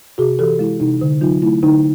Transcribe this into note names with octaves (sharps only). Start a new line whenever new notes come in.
C3 F#4 G#4
E3 G4 A4
G#3 E4
C3 D#4
D3
F#3 D#4 F4
A3 E4
D3 D#4